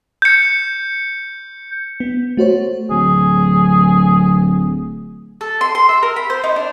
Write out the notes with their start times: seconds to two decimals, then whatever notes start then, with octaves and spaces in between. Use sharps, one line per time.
0.22 G6 C#7
2.00 B3
2.37 A3 F#4 C5 C#5
2.91 D1 G#4
5.41 A4
5.61 C6
5.75 C6
5.89 E5
6.03 A#4
6.16 B5
6.30 C5
6.44 D#4
6.56 D4